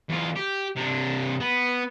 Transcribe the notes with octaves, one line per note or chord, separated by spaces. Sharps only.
E2 F4
G4
C3 D4
B3